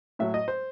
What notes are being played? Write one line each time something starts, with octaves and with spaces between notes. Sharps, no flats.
A2 F#3 E5
D#5
C5